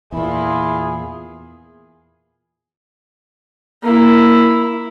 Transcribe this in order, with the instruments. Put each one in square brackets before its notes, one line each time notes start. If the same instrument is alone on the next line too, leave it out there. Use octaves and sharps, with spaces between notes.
[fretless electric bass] E2 A#2 [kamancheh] E4 F4 [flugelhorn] G#4
[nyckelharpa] A#3 E4